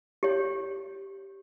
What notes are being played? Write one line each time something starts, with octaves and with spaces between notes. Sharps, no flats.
G4 C#5